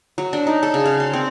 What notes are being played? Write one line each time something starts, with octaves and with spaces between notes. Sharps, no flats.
F#3
D4
D#4
A4
C#3
F5
C6
C4